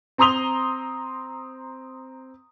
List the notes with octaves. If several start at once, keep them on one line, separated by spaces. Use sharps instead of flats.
C4 A#5 C6 D#6 F7 G7